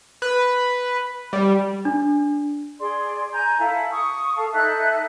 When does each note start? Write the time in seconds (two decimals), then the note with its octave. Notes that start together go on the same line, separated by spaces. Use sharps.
0.22 B4
1.33 G3
1.85 D4
2.80 G#4 D5 C6
3.32 G#5 A#5 G6
3.59 E4 A4 F5
3.91 C#6 D#6
4.36 A4 F5 A5
4.53 D#4 A4 E5 F#6